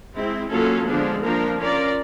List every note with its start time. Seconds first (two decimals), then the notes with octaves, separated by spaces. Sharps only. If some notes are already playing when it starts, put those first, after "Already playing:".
0.15 G#3 C4 E4
0.51 F#3 A#3 C#4 F4 A4
0.87 D3 F3 G#3 B3 D4
1.23 F3 A#3 D4 F4 A#4
1.59 C#4 F4 A#4 D5